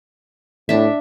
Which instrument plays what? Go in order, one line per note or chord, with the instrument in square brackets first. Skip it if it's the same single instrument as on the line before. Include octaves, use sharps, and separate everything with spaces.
[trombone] A2 [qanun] D4 E5